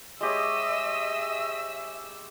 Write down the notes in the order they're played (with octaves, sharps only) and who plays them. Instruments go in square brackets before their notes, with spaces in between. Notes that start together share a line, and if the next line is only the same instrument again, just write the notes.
[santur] G#3 G4 C#5 [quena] D#5 [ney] E5 [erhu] E6